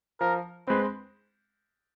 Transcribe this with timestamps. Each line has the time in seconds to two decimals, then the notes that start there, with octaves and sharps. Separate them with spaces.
0.20 F3 A#4
0.67 G#3 C4 B4